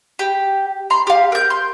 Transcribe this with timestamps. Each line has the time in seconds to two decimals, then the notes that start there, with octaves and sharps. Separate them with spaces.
0.19 G4
0.90 A#5 C6
1.07 G4 F5
1.32 A#4 G6
1.50 C6